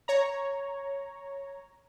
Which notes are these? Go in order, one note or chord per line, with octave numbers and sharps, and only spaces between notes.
C#5 A#5